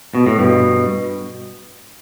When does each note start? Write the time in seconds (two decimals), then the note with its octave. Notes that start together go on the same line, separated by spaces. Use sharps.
0.15 B2
0.27 A2
0.39 G2 B2